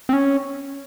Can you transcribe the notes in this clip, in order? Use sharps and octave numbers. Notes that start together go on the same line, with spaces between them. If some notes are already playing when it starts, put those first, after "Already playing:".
C4
C#4